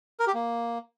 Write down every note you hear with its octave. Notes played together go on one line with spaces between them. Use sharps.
A#4
G4
A#3